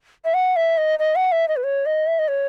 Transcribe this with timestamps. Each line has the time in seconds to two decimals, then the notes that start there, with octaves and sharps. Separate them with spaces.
0.25 E5
0.34 F#5
0.56 E5
0.78 D#5
0.99 D#5
1.16 F#5
1.32 E5
1.48 D#5
1.56 B4
1.64 C#5
1.86 D#5
2.07 E5
2.19 D#5
2.28 C#5